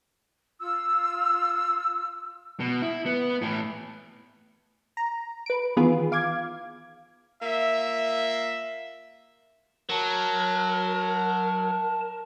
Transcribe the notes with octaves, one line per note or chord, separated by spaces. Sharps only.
F4 E6
B2
E4
B3
A2 E3
A#5
B4 D7
D#3 E3 B3 F4 G#4 B4
F5 D6 G#6
A#3 F4 E5
F#3 A#4 A5